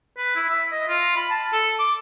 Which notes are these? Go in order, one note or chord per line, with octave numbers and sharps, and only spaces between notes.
B4
E4
E5
D#5
F4
B5
A5
A4
D6